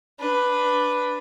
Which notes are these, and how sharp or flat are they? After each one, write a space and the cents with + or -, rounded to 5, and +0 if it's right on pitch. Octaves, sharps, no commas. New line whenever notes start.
D4 +0 B4 +0